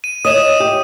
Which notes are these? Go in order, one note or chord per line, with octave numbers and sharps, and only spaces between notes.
D#7
E4 C#5 D#5 D#6 D#7 E7
G4